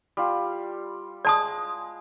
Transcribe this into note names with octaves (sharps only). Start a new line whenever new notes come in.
G3 F4
G#3 D5 A5 D#6